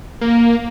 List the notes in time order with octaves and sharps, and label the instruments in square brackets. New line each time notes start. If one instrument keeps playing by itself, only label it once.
[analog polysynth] A#3